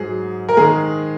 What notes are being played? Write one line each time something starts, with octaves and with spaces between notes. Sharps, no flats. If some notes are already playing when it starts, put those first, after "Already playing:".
Already playing: G#2 F#3 G#4
A#4
D#3 G#3 G#4